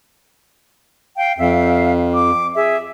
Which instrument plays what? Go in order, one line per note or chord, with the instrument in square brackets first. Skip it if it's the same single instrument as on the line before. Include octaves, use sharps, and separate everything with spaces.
[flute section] F5 G5
[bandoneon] F2 [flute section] E5 F5
[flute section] D6
G#4 E5